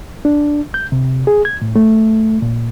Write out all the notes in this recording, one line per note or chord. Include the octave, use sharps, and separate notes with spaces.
D4
G6
C3
G#4
G#6
A2
A3
A#2